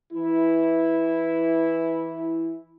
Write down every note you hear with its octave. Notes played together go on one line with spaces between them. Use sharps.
E3 E4